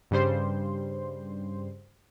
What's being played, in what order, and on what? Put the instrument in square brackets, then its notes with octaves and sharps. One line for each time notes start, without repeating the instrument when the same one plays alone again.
[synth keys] G2 C#3 G3 C5 C6